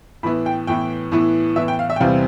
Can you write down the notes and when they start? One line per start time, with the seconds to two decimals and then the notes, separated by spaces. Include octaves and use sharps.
0.23 A2 E3 B3 E4 B5
0.46 G5
0.67 A2 E3 B3 E4 G5
1.12 A2 E3 B3 E4
1.56 A2 E3 B3 E4 E5
1.68 G5
1.79 F5
1.90 E5
1.96 G5
2.00 E2 C3 G3 C4 E4 F5